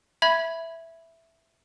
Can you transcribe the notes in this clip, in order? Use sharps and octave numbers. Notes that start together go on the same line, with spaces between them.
E5 B5 G#6